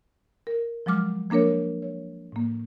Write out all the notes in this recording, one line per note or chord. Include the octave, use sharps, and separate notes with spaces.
A#4
F3 F#3 G#3 D6 F6
F3 A#3 D4 A#4 C#5
C#5
A2 A#3